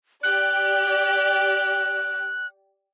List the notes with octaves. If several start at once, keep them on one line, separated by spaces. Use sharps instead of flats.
G4 D5 F#6